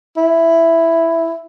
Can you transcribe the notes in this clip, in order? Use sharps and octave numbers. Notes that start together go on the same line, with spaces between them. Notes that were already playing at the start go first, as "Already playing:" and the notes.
E4